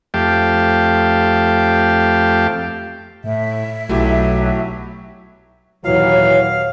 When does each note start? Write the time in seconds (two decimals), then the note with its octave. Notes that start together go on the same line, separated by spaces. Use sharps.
0.14 F2 A3 G4 F5 G5 A5
3.24 A2 E5
3.89 B1 F#3 A3 E4 G4
5.85 D#2 A#2 E3 F#3 C#5 F5